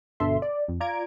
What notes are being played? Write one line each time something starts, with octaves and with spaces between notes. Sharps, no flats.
G1 B2 D3 A4 E5 C6
D5
F2
F4 D5 A#5 G#6 D7